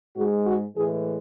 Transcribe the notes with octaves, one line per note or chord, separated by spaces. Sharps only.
G#2 G#3 F#4
F#4
A2 E3 G#3 G#4